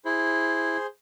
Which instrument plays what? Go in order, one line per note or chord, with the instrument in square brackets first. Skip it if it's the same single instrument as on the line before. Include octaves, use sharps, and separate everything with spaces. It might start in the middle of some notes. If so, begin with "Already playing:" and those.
[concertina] E4 [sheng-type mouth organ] G#4 C5